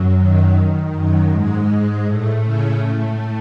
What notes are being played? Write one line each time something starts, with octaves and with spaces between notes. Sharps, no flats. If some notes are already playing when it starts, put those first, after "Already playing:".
Already playing: F#2 F#3
D#3
D#3
F#2 F#3
G#2 G#3
A2 A3
C#3 C#4
A2 A3